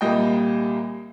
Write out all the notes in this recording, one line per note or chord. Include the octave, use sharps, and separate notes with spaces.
C2 A#2 G3 A#3 D#5 G5